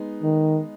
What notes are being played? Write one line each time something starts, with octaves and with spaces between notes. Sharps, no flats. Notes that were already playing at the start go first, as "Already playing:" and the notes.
Already playing: G#3 B3 D#4
D#3